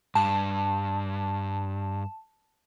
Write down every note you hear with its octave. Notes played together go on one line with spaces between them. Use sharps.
G2 A5